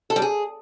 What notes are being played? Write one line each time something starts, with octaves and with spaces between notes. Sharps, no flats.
A4
G3
G#4